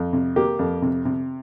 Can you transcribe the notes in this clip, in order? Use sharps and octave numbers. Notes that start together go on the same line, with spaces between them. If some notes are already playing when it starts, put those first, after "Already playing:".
Already playing: F2
C3
A#3 G4
F2
C3
C3